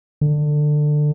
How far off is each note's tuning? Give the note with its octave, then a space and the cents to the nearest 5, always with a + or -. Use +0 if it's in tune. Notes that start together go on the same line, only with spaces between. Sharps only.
D3 +20